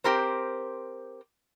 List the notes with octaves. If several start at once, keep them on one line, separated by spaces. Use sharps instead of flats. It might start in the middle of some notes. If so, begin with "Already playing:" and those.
C4 G4 A#4 C5